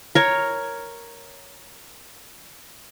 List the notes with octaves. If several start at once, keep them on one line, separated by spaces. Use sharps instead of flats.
A#4 C#5